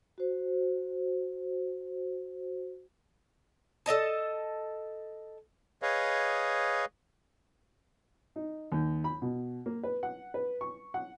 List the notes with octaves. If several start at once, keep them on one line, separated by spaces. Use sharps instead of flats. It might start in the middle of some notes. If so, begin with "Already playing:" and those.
F#4 C5
A4 C#5 D#5 A5
G#4 B4 C#5 D#5 F5
D#4
D#2
B5
B2
A#3
B4
F#5
B4
C#6
F#5